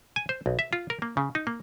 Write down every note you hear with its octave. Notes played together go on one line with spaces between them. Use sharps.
G#5
C5
B1
E5
F4
A#4
A#3
C#3
D#4
A#3